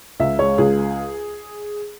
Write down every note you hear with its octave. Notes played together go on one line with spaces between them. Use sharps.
C#2 E5
G#3 C#5
C#2 G#4